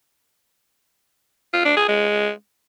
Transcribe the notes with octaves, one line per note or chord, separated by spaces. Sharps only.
F4
D4
G#4
G#3